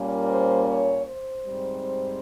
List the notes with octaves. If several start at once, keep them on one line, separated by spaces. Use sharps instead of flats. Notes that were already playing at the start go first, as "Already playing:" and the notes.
Already playing: A#2 G3 A#3 C#4
C5
C#5
C5
G#2 G3 C4